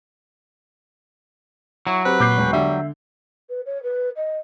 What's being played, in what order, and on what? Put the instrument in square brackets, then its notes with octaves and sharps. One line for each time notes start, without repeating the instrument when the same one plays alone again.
[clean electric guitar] F#3 [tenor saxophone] E4 [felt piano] C#6
[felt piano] C4 G4 [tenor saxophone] B4
[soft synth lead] A#2 [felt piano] D6 G6 C7
[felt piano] E1
[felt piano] D3 [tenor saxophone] G3 [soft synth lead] E5
[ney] B4
C#5
B4
D#5